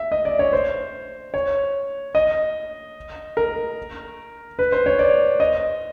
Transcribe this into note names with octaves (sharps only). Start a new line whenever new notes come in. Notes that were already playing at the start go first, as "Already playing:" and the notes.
Already playing: E5
D#5
D5
C#5
C5
C#5
D#5
A#4
B4
C5
C#5
D5
D#5